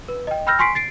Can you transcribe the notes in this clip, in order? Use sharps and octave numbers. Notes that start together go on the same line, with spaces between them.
B4
D#5 G5
G5 B5 E6 F6 G6 A#6
G#5 C6 C#6 B6 C7 D7
A6 C7 D7